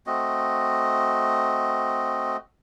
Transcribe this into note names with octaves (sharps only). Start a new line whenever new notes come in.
A3 C4 F#4 D#5